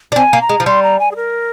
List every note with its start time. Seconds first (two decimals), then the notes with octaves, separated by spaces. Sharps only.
0.12 D4
0.16 C4 G#5
0.33 A#3
0.41 A#5
0.49 G#3
0.60 F3
0.66 G3 C6
0.83 A#5
0.99 G#5
1.11 G#4
1.16 A#4